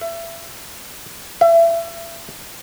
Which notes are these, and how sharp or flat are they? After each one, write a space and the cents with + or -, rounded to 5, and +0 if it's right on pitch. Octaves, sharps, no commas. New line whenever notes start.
E5 +25
E5 +30